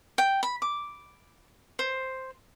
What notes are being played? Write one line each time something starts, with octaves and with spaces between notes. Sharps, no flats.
G5
B5
D6
C5